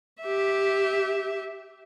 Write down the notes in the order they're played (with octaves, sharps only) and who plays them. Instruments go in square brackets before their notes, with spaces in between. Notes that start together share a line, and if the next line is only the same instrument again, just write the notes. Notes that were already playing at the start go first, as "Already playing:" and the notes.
[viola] G4 E5